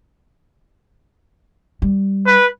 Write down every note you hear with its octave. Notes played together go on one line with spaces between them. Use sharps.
G3
B4